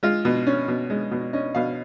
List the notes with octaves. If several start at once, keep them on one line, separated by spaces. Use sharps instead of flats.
G#3 F4
B2
C#4
B2
G#3
B2
C#4 D#5
B2 F5